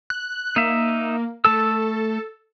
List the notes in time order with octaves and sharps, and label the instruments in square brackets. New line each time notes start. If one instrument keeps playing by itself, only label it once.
[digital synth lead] F#6
[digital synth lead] A#3 [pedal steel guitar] D#4 E5
[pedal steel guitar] A3 A5 E6 [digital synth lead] A4